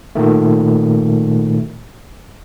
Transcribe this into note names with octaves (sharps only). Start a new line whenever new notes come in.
A#2 D#3 A3